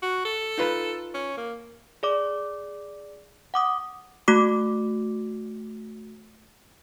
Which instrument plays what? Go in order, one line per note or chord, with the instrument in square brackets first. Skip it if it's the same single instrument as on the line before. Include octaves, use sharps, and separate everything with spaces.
[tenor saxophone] F#4
A4
[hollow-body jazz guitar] D#4 F4 B4
[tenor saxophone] C#4
A#3
[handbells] G#4 D5 D6
F#5 D6 D#6
A3 F#4 D6